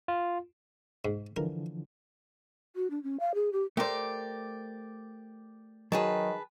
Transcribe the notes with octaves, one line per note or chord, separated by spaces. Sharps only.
F4
G#2
D3 E3 F3 A#4
F#4
D4
C#4
F5
G#4
G4
A3 G4 A#4 C5 D5
D#3 F#3 G#4 B4 A5